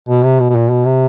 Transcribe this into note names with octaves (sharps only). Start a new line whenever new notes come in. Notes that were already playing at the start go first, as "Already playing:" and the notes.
B2
C3
B2
B2
A#2
B2
C3